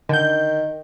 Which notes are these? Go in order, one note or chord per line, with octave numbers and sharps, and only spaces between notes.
D3 D#3 G6